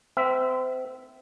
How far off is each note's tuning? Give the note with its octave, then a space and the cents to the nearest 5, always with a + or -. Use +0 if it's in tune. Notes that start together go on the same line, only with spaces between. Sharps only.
C4 -30 E5 +0